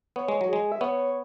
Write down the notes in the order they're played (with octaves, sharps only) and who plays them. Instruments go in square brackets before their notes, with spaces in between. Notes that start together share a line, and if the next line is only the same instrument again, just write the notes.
[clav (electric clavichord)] B3 [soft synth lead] C#5
[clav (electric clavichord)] G#3
F#3
[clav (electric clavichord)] G#3 [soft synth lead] G#4
[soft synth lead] E5
[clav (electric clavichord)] B3 [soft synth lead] C#5